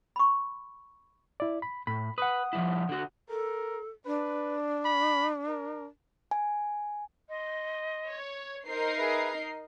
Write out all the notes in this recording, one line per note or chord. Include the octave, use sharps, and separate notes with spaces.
B5 C#6
E4 D5
B5
A2 B5
B4 F#5 D#6
F3 G3 E4
D3 F#4
A4 A#4
D4 B4
B5
A#4
G#5
D#5 C6
C#5
D#4 A#4 C5 C7
G#4 B4 E5
D#5